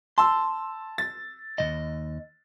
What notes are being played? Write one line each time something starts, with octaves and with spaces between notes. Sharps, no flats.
A5 C6 E6
A6
D#2 D#3 D#5